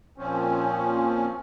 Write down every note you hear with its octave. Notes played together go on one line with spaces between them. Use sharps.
A#2 F3 C4 C#4